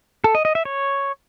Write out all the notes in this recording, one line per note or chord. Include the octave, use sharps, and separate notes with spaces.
A4
D#5
D#5
E5
C#5